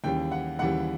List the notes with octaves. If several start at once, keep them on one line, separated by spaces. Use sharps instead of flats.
D#2 C#3 E3 G3 G5
F#5
D#2 C#3 E3 G3 F#5